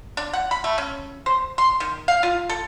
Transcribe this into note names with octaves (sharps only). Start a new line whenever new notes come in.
D4
F#5
B5
A3
C#4
C5
C6
D#3
F5
F4
A4